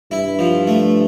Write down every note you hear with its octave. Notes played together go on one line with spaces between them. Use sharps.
G2 E4
F3
A3